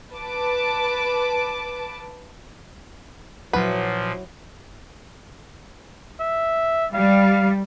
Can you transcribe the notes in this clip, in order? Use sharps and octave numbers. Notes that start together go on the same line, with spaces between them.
B4 A5 D6
A#2 F3 F#3 E4 B4 F#5
E5
G3 F5